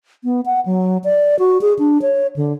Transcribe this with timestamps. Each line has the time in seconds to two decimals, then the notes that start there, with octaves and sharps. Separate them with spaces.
0.24 B3
0.46 F#5
0.66 F#3
1.04 D5
1.39 F#4
1.61 G#4
1.79 D4
2.02 C#5
2.36 D3